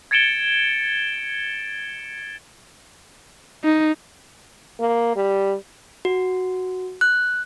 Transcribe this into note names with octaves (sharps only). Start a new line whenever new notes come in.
G#6 A6 C#7 D7 E7 G7
D#4
A#3
G3
F#4
F#6